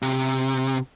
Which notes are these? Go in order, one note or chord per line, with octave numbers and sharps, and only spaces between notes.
C3